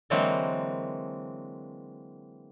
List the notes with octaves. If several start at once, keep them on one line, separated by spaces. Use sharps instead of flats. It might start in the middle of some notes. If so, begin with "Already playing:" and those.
D3 E3 F#3 G#3 A#3 C4